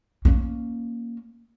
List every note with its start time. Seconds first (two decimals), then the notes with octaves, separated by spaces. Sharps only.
0.25 A#3 C#4